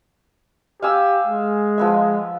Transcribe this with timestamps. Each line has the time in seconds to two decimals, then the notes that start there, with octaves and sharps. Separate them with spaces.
0.82 G4 F5 G#5 E6
1.27 G#3
1.78 F3 B3 E5